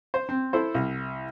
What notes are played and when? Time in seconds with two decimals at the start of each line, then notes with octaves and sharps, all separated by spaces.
0.14 C5
0.29 C4
0.53 E4 A4 C5
0.74 C2